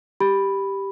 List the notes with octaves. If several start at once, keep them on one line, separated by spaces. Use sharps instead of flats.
G4 B5